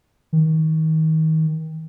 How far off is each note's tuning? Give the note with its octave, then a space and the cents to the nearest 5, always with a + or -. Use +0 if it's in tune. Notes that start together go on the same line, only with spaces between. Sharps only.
D#3 +30